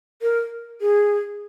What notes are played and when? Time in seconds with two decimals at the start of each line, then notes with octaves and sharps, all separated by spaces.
0.22 A#4
0.81 G#4